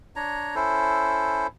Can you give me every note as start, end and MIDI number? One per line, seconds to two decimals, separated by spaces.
0.16 0.55 62
0.16 0.55 73
0.16 0.55 82
0.56 1.47 61
0.56 1.47 64
0.56 1.47 69
0.56 1.47 72